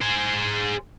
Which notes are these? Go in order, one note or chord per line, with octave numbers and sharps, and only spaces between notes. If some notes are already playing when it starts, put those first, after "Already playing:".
G#4 C5